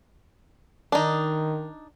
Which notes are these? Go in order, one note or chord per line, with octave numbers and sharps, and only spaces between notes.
D#3 D4 D#4